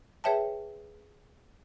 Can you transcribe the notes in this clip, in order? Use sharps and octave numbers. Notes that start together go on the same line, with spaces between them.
G#4 B4 C#5 E5 G5 A5